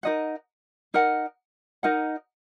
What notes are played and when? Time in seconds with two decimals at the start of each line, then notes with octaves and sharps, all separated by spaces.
0.03 D#4 A#4 D#5 F#5
0.94 D#4 A#4 D#5 F#5
1.83 D#4 A#4 D#5 F#5